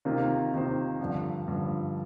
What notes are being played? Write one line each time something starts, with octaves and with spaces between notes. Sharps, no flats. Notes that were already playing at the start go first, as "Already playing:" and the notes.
C3 D#3 A#3 F4 C5
C3 D#3 A#3 F4 C5
G2 D3 F3
G2 D3 F3